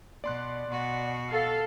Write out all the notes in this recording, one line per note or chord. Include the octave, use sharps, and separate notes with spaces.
B2 D5 C6 F#6
B2 F#4
A4 F5